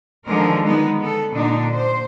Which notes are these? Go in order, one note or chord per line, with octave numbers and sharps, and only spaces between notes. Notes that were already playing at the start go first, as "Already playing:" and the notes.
D3 D#3 F3 G#3 A#4
G#3 B3 D#4
B3 A4
A#2 D3 D4 D#4
C5